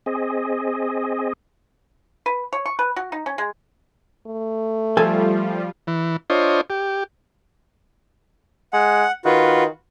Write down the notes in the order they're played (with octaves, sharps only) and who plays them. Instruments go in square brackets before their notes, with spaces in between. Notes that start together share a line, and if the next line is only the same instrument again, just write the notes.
[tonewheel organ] C4 G#4 D#5
[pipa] B4
C#5
C#6
B4
F#4
D#4
C#4
G#3
[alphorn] A3
[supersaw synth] F3 G3 F4 [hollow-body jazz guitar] A4 G#5
[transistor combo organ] E3
D4 F4 C5 C#5 D#5
G4
[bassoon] G#3 [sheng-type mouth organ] F#5
[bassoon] D#3 [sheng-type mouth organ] F4 F#4 B4